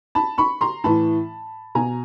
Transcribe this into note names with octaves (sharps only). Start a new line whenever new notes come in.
A5 B5
B5 C#6
A#5 C6
A2 E3 A5 B5
B2 G#5 A#5